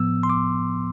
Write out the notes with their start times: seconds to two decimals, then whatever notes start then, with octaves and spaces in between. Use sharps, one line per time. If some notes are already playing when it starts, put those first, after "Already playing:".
Already playing: A2 F3 B3 E6
0.23 C6
0.30 D6